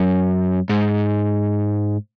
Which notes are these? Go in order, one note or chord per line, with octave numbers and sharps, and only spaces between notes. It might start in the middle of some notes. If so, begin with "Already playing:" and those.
Already playing: F#2
G#2